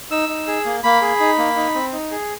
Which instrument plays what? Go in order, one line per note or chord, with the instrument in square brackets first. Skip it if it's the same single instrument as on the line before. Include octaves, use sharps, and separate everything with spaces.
[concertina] D#4 E6
D#4
G#4
A#3
A#3 B5
G#4
D#4
A#3
D#4
C4
D#4
G#4